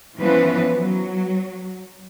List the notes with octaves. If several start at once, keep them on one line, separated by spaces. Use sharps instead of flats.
E3 F3 B3 C#4 B4
F#3